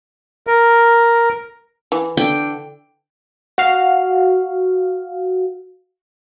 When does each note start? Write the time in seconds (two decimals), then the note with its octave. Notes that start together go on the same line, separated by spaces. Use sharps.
0.47 A#4
1.92 E3
2.17 D3 G5
3.58 F#4 F5